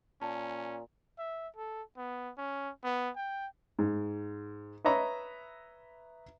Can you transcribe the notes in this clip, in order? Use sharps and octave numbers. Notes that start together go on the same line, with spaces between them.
A#2 C#4 A5
E5
A4
B3
C#4
B3
G5
G#2
B4 C#5 D#5 E5 A#5 B5